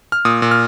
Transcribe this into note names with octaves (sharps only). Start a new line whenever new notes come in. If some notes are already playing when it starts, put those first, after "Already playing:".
F6
A#2 D#6
A#2
F6